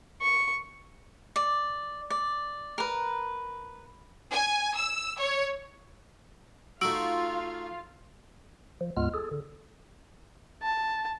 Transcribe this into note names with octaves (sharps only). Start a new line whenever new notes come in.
C#6
D5
D5
A#4 B4
G#5
E6
C#5
A3 D#4 F4 F#4 F5 E6 D7 F#7
F3
D2 G#2 G#3 B3 F4 F6
G#4 A4
D3
A5